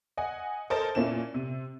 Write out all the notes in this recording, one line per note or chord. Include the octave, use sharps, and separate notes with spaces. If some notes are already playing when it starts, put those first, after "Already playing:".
D#5 F#5 G#5
A4 A#4 C5 D#5 A5
A#2 A#3 C#4 E4 E7
C3